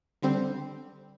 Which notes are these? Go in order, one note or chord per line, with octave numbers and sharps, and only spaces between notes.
D3 G3 C4